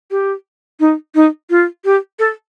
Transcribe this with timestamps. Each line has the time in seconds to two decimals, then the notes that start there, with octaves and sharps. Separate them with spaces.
0.11 G4
0.80 D#4
1.15 D#4
1.50 F4
1.85 G4
2.19 A4